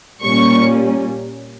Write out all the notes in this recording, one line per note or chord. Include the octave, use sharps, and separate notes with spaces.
A#2 G3 A#3 C#4 C#6